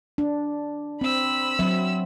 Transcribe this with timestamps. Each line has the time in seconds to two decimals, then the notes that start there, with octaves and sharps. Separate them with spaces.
0.18 D4
1.01 C4 B5 E6
1.59 F#3 C4 E5